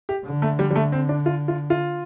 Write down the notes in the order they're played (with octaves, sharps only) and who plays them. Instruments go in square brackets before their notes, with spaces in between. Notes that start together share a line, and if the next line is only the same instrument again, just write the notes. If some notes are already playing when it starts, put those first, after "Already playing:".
[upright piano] G4
[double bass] D3
[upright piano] A3
G3
G3
A3
C4
D4
F4
F4
F4